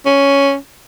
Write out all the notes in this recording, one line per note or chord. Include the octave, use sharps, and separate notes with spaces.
C#4